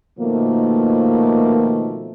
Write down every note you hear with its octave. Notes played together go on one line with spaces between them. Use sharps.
B2 D#3 F3 A3 A#3